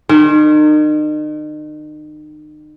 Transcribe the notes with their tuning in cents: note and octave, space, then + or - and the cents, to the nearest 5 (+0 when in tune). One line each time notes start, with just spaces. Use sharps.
D#3 -40